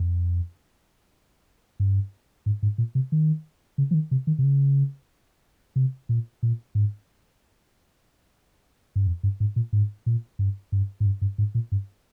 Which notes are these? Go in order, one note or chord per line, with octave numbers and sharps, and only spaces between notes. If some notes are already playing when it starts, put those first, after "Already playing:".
Already playing: F2
G2
G#2
G#2
A#2
C3
D#3
C#3
F3
D#3
C3
D#3
C3
C#3
C3
A#2
A#2
G#2
G2
F2
G2
G#2
A#2
G#2
A#2
G2
G2
G#2
G2
G2
G#2
A#2
G2